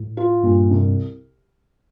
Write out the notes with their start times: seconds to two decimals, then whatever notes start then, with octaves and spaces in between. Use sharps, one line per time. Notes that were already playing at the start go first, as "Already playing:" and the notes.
Already playing: A2
0.17 F4
0.43 G2 A#2
0.71 C2